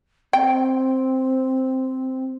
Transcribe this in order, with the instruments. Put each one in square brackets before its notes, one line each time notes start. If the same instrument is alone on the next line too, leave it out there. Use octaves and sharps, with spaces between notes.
[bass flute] C4 [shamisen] G5